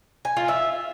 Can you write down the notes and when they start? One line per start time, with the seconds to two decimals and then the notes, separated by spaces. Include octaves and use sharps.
0.25 G#5
0.37 F4
0.48 E5